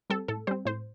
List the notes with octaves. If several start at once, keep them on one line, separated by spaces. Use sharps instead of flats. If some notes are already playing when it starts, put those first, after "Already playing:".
G3 C4 A4
A2 A4
G3 C4 C5
A2 C5